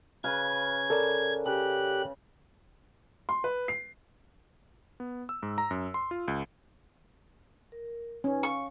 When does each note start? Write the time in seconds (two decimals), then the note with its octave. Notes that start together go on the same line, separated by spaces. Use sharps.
0.24 C#3 B4 F5 G#6
0.90 A4 A#4 D5
1.46 C#3 G4 F#6
3.29 C6
3.44 B4
3.68 C7
5.00 B3
5.29 E6
5.43 G#2
5.58 A#5
5.71 F#2
5.94 C6
6.11 F4
6.28 C#2
7.72 A#4
8.24 C#4 D#4 B4
8.43 F5 C#6